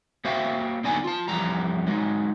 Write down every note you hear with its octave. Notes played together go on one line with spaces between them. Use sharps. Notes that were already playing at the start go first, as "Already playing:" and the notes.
A#3 F#4 C5 E5 F5 G5
D3 F#3 B3 D#4 D5 G#5
F4 A5
E2 E3 F3 G3 A#5
F#3 G#3 D#4